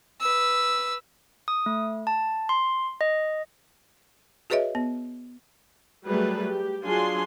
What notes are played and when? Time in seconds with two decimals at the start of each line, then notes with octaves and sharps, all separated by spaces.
0.21 B4 E6
1.48 D#6
1.66 A3
2.07 A5
2.49 C6
3.01 D#5
4.50 F#4 G#4 B4 C#5 D#5 E5
4.75 B3
6.06 F#3 G3 A3 G4 G#4 B4
6.44 G4
6.85 F#3 D4 F4 G#4 G#5 C6